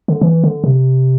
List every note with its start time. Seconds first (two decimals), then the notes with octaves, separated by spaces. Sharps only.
0.08 D3
0.21 E3
0.44 D3
0.64 C3